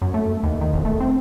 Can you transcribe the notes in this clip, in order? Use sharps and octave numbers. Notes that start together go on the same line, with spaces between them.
F#2
A3
D#2
D#3
E1
A3
C4